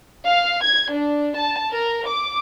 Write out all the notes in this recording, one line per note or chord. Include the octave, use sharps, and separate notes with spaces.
F5
G#6
D4
A5
A#4
D6